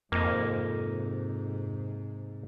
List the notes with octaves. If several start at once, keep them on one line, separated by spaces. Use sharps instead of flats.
F2 G#2 C3 A#3 D#5